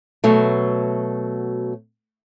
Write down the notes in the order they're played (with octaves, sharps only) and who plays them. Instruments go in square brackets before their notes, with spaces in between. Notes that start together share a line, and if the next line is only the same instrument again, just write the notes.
[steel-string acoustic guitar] B2 F#3 A3